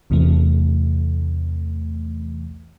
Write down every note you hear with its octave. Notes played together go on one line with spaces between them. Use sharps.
B1 E2 C3 E3 A3